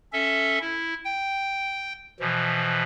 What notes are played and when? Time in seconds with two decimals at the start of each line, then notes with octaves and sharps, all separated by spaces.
0.13 C#4 A4 E5
0.61 E4
1.05 G5
2.20 B2 E3 F3